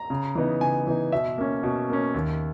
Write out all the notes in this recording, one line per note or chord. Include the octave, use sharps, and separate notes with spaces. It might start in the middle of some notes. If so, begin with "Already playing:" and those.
Already playing: A#5
C#3
E3 B3 D#4
C#3 G#5
E3 B3 D#4
B2 E5
A#3 C#4
B2
A#3 C#4
D#2